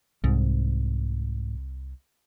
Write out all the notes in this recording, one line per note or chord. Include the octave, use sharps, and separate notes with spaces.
C2 G#2